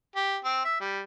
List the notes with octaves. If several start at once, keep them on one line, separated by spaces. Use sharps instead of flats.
G4
C4
E5
G3